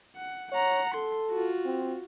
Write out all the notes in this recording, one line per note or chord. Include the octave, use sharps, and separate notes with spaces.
F#5
C#5 F#5 A#5
A4 C6
F4 F#4
C4